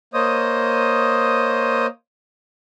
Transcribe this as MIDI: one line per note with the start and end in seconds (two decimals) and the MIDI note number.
0.14 1.86 58
0.14 1.86 72
0.14 1.86 73
0.14 1.86 75
0.14 1.86 87